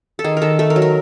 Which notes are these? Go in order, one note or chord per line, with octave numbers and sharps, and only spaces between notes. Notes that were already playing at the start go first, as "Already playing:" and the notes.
A4
D#3 G#4
D#3 A4 A#4
A3 A4
A#4
F#3
A#4